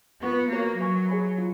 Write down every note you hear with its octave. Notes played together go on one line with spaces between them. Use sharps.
B3 F4 B4 F#5 C#6
A#3 F#4 A#4 C#5
F#3 B4 F5 G#5 C#6
G#4 C#5 G#5 B5
F4